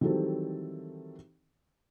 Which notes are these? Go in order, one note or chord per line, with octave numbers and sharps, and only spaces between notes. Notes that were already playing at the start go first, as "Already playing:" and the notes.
D#3 E3 F#3 G3 C4 A4